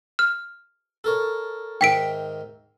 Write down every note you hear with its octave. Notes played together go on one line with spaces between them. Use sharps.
F6
A4 A#4 C#5
G#2 D#3 E5 G5 B6 D7